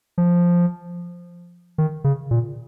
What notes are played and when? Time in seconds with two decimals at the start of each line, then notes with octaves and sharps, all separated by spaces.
0.18 F3
1.78 D#3
2.04 C#3
2.31 A#2